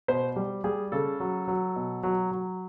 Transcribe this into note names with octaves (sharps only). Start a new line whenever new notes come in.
B2 C5
G3
G3 G#4
C#3 A4
F#3
F#3
B2
F#3
F#3